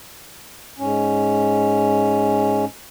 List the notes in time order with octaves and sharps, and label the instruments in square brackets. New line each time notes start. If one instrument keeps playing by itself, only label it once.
[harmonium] G#2 C#4